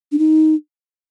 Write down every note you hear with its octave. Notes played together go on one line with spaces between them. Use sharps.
D4
D#4